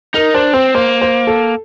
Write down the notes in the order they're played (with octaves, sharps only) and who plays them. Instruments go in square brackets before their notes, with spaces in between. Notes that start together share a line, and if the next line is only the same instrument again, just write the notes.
[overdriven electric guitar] D#4 [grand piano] A#4
[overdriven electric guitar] D4 [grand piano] C5
[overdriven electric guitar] C4 [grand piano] C5
[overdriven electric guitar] A#3 [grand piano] C5
[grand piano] C5
A4